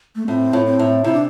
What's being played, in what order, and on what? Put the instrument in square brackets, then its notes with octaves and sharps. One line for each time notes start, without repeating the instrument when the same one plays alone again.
[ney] A3
[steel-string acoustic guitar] A2 [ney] C4
[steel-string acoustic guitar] A2
[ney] C4
[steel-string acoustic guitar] A2
[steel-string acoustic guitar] C3 [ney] E4
[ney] D4